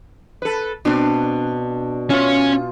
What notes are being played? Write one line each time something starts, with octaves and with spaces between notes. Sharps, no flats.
A4 B4
B2 C4 D4
C#4 F4 C#5 E5